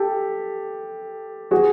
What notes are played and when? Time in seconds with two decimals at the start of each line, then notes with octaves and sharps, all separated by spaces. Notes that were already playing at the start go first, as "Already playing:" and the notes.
Already playing: G4 A4
1.51 F#4 G#4